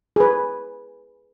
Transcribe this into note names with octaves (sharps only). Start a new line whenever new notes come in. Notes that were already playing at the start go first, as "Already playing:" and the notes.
G#4 B4